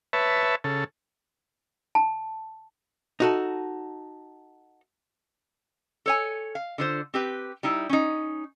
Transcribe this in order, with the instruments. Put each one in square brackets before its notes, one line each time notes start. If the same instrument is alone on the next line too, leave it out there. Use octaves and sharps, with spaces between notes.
[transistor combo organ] B4 C#5 E5 A5
C#3 A4
[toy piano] A5
[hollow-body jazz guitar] D#4 F#4 A4
[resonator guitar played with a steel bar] A4 C#5 G#5
F5
D3 F4 C5
C4 G4 B4
G3 D#4 E4
C#4 D#4